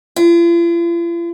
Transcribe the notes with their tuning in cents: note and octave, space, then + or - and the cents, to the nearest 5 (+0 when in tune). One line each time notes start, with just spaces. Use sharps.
F4 -45